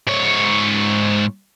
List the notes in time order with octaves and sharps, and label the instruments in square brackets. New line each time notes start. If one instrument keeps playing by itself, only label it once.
[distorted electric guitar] G#2 C#5